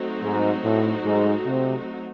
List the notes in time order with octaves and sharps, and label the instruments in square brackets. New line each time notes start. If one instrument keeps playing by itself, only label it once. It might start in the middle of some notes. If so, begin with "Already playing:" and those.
Already playing: [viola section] F#3 A3 C4 D#4 F#4
[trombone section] G#2
A2
G#2
C3